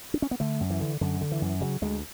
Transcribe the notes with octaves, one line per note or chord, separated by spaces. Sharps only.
D4
C#4
B3
D3 A3
F#2
E3
D3
F#2 D3
D3
E3
F#2
C#3 F#3
D2 G#3